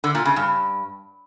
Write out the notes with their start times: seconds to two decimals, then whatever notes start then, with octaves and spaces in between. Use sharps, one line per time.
0.04 D3
0.15 A#2
0.26 C#3
0.36 G2